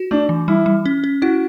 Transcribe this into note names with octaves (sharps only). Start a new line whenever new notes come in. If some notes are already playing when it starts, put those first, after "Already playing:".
Already playing: F#4
A3 D4
E3
G3 E4
G3
C#4
C#4
E4 F#4